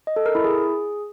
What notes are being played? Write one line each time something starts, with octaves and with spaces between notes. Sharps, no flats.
D#5
A4
A#4
E4
G#4